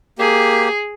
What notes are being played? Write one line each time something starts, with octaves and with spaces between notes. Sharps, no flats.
A#3 G4 G#4